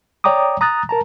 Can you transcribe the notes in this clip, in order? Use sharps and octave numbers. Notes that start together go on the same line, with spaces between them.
C#5 D5 G5 A#5 D6 D#6
A#5 D#6 F#6 A6
A#4 A5 A#5